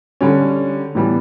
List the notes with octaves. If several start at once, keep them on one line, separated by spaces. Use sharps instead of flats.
D3 G3 C#4
A2 E3 G3 B3